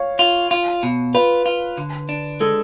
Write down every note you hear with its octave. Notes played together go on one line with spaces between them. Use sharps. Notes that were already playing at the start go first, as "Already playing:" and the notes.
Already playing: C#5 F5
F4
F4
B2
F4 B4
F4
D3
D4
G#3 A4